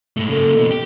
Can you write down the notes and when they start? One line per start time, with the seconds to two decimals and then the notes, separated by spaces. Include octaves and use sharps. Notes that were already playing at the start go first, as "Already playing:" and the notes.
0.17 G#2 A3
0.29 C#3 A#3 A4
0.57 B2 E3
0.71 G4